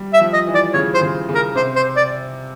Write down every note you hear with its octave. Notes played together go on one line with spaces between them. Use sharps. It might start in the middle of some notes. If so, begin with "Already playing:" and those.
Already playing: G3
E5
F3
D#5
E3
D5
C#3 C#5
C5
C#3
C#3
A#4
C3 C5
C5
D5